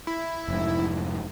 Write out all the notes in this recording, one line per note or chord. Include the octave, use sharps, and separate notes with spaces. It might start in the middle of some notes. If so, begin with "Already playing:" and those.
E4
F1 G#2